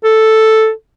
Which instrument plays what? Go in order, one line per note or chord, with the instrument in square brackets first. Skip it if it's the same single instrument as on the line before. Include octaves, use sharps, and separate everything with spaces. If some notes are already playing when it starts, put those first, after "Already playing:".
[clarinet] A4